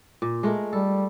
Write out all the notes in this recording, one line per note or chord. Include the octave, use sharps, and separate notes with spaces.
A#2
G#3 A3 A#4
G3 A4